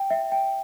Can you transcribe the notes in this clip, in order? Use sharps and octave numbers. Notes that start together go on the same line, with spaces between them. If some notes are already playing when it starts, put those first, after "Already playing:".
Already playing: G5
E5
G5